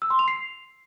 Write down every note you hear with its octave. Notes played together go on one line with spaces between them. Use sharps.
E6
C6
F7
C7